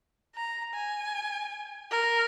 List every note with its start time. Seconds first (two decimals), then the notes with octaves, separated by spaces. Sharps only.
0.36 A#5
0.75 G#5
1.91 A#4